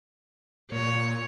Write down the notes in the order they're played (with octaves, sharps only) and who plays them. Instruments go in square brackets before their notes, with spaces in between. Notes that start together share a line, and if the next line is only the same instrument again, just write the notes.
[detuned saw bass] A#2 [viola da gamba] C#5